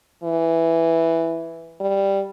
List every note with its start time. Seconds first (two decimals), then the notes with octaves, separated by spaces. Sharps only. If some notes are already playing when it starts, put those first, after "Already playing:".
0.23 E3
1.80 G3